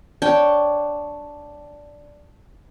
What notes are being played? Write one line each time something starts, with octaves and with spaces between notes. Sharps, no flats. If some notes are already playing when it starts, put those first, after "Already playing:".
D4 C#5 G5